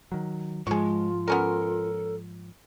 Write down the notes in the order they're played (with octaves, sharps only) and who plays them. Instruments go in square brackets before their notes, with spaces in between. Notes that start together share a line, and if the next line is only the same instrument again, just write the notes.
[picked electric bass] D#3 F#3
[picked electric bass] G#2 F3 [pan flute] G#3 [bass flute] F4 [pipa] G#4 C#6
[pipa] B3 C#4 A#4 [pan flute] A4